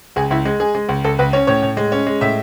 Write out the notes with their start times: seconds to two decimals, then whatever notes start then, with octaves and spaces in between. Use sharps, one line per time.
0.16 C#2 G#4
0.31 C#2 E4
0.45 G#3
0.60 G#3 G#4
0.75 G#3
0.89 C#2
1.04 C#2 A4
1.19 C#2 B4
1.33 C#4 C#5
1.47 A2 C#5
1.62 A2
1.77 G#3
1.92 C#4
2.07 G#3
2.21 A2 E5